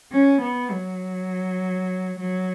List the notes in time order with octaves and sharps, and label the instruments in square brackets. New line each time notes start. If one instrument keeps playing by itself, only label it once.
[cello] C#4
B3
F#3
F#3